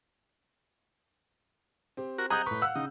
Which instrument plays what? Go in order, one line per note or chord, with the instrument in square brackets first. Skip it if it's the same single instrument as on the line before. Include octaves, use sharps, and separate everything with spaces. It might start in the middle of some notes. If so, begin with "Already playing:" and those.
[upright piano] C4 G4
[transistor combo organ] F#4 A#4
[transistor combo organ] G#4 D#5 F#5 [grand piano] A#5 D#6 G6
[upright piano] A2 C#6 [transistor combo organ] B4
[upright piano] F5 F#5 E6 [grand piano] F#6
[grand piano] C#3 [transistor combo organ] D#4